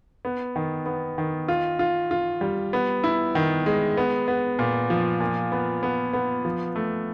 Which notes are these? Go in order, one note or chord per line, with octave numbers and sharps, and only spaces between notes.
B3
D#3
B3
D#3
F4
F4
F4
G3
B3
E4
D#3
G#3
B3
B3
A#2
F3
A#2
B3
B3
B3
F3
A3